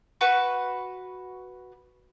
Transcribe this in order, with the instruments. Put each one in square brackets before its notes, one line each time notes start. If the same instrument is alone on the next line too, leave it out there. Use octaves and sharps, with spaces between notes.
[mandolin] F#4 B4 C#6